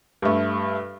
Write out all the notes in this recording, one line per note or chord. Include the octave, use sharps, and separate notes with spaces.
G2 A3